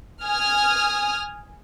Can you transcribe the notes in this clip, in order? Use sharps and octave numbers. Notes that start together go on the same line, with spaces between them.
G#5 D#6 F6